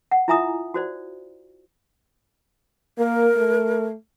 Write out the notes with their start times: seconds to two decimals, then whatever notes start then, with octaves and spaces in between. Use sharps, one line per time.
0.11 F#5
0.28 E4 F4 E5 G#5 A#5 D#6
0.74 F#4 C5 D5
2.99 A#3 A#4
3.37 A3